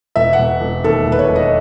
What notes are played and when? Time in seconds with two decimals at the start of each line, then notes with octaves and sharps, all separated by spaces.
0.16 E1 E5
0.33 F#5
0.39 E1
0.61 E1
0.84 D#2 A4
1.07 E1 B4
1.19 C#5
1.29 E1
1.36 D#5